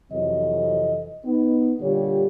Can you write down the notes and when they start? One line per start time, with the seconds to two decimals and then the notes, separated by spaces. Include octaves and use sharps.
0.11 F2 C3 E3 F#3 A4 D#5
1.25 B3 D#4
1.80 A#2 D3 G3 F4 G4 C#5